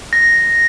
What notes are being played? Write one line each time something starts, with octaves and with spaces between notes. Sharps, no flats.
A#6